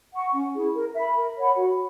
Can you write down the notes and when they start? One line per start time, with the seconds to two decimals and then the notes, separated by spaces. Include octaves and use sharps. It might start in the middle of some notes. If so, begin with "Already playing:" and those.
0.13 F#5 C#6
0.33 C#4
0.54 E4 G#4
0.75 A#4
0.94 E5 B5
1.16 A#4
1.37 C#5 F#5 B5
1.56 F#4